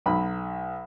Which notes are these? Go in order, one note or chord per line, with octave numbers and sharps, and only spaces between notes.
B1 B5